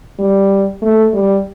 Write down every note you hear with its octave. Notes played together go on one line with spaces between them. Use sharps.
G3
A3
G3